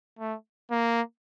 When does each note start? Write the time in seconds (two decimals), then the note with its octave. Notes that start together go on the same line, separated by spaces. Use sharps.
0.19 A3
0.71 A#3